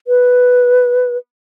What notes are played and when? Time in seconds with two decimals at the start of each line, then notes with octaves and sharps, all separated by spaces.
0.07 B4